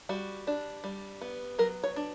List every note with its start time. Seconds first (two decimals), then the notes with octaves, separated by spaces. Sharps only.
0.09 G3 F#4
0.47 D4
0.84 G3
1.22 B3
1.59 F#3 A#4
1.84 C#5
1.96 D4